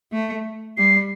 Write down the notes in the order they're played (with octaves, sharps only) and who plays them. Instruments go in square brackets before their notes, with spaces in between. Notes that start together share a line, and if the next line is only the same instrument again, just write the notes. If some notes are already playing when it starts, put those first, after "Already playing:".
[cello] A3
[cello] G3 [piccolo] C7